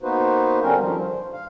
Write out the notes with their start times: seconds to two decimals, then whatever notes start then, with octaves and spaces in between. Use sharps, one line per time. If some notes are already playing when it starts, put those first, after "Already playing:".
0.02 A#3 B3 D#4 F#4 B4 C5
0.62 D3 G3 C4 C#4 A#4
0.81 G2 D#3 F3 G3
0.98 G2 C5
1.33 F5